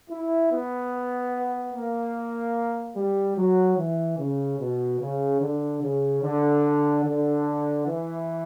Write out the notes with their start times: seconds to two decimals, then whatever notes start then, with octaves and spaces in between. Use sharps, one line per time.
0.10 E4
0.52 B3
1.74 A#3
2.96 G3
3.38 F#3
3.77 E3
4.19 C#3
4.60 B2
5.01 C#3
5.41 D3
5.82 C#3
6.23 D3
7.05 D3
7.86 E3